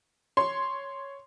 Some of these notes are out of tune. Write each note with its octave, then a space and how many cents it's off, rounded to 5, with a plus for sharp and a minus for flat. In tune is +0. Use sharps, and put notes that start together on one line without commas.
C#5 +0 C6 +0